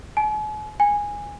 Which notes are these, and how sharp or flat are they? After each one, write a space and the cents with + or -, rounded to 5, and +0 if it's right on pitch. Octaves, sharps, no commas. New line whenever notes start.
G#5 +45
G#5 -10